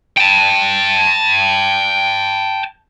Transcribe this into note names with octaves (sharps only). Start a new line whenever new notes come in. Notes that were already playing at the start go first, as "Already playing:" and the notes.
G5 A5